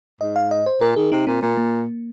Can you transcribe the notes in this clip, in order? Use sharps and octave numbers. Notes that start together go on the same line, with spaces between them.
G#2 D#5
F5
D#5
C5
A#2 A#4
D#3 G#4
C3 D#4
A#2 C4
A#2 A#3
A#3